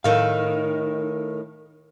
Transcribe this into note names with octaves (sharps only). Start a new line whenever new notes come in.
A2 D#3 A4 F5